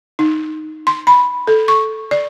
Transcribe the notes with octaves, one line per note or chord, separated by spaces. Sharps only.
D#4
C6
B5
A4
C#6
D5